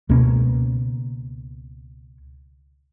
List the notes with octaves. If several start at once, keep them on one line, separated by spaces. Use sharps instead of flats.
C#2 B2 A#3 C#4